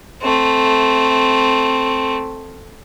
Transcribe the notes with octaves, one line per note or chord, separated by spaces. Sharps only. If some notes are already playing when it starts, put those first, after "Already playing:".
A3 C4